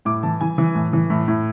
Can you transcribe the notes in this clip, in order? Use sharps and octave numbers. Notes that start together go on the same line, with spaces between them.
A2 D6
E3 A5
E3 G#5
E3
A2
E3
A2
A2